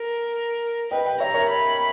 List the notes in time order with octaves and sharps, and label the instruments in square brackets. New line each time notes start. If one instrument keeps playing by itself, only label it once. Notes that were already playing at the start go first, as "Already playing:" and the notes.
Already playing: [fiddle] A#4
[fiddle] B4 [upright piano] D#5 G5
[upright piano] D#5 G5
[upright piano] C#5 E5 [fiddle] A#5
[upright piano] A#4 C#5
[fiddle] B5